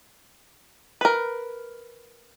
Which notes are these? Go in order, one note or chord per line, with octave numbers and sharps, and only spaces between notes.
A#4 B4